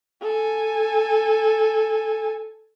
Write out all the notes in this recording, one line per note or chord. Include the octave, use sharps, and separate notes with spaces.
A4 G#5